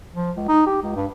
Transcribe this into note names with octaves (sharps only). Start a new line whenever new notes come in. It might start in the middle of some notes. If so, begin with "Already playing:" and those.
F3
C#2
D#4
G4
C#2
G2